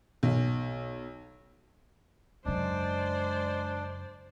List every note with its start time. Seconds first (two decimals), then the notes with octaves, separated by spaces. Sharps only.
0.23 B1
2.45 F#2 C#3 G#3 D4 C5 D5